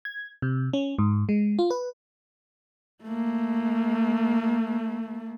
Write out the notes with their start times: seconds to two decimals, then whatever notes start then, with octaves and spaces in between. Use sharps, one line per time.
0.05 G#6
0.42 C3
0.73 C#4
0.99 G#2
1.29 G#3
1.59 F4
1.70 B4
3.03 A3 A#3